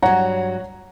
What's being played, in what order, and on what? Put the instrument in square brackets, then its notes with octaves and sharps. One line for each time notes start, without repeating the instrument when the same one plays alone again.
[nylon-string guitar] G2 F#3 [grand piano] C#5 F#5 A#5